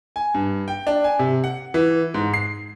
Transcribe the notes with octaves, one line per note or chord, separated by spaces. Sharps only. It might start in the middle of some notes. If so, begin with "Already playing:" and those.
G#5
G2
G5
D4
G#5
C3
F#5
E3
G#2
C7